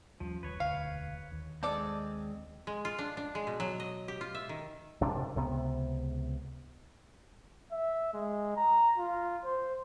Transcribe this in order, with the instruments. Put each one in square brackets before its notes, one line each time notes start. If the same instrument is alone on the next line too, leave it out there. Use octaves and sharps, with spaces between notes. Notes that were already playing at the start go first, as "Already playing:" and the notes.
[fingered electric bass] D#2 G3 C#4 [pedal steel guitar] F3
[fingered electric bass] D#1 D#2 [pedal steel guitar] B4 C#5
[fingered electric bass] E1 D2 [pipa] F5
[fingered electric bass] D#2
[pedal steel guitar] G#3 C4 [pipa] D4 A4 D5
[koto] G#3
F4
D4
D4
G#3
B2
F#3
D#5
G4
F4
E5
D#3
[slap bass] F#1 C3 D4
C#2 C3 B3
[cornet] E5
G#3
A#5
F4
C5